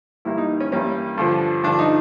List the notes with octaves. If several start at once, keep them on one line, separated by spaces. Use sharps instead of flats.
G2 E3 G3 A#3 E4
D#4
C#4
G2 E3 G3 A#3 C#4
G2 D3 F3
G2 D3 F3 D4
D#4